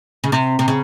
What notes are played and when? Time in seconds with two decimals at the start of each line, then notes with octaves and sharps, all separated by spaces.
0.24 C#3
0.32 C3
0.59 C3
0.68 C#3